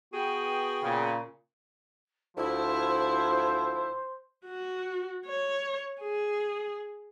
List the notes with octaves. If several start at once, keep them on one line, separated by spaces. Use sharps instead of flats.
B3 F#4 G#4 G5
A#2 C#3
D2 F3 E4 C5
F#4
C#5
G#4